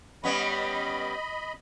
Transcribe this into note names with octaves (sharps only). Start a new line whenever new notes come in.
G3 B3 C#4 D#5 B5